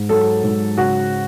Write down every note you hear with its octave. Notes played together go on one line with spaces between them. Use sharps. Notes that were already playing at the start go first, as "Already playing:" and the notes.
Already playing: G#2
F#3 A4
G#2
C#3 F#4